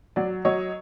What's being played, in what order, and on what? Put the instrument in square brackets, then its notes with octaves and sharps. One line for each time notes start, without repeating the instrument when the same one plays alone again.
[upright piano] F#3 D5
F#3 C#5 D#5